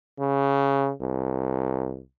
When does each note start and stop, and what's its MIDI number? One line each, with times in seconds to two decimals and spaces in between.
0.19 0.91 49
1.01 2.00 36